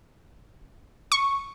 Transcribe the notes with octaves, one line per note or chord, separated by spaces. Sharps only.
C#6